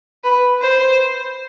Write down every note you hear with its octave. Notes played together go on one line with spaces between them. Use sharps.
B4
C5